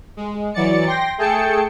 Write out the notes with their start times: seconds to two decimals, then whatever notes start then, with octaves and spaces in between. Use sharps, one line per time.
0.17 G#3
0.53 E3 F#3 D5 A6 C#7
0.86 G5 C6 A#6
1.18 A3 G#4 G5 A5 C#7